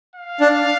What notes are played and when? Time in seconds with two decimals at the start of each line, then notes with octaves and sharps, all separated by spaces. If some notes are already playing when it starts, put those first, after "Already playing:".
0.15 F5
0.41 D4